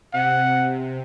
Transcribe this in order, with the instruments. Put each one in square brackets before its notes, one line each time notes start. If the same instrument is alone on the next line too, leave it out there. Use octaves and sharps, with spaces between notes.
[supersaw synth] C3 [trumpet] F#5